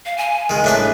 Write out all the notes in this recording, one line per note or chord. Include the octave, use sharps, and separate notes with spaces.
F5
G#5
D#3 G#3
A2 D4 B4 E5